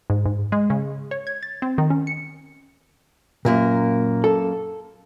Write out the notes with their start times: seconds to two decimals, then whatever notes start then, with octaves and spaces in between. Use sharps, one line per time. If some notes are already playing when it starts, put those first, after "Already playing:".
0.10 G#2
0.26 G#2
0.52 G#3
0.70 C#3
1.11 C#5
1.27 G#6
1.43 A6
1.62 C4
1.78 D#3
1.90 C#4
2.07 C#7
3.45 F#2 A#2 A#3 A#4
4.24 A4